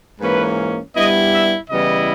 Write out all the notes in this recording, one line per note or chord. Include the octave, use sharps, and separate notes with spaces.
G#2 E3 A#3 C#4 B4
G2 G3 B3 E4 D#5
E5
C#3 E3 G3 B3 E4 D#5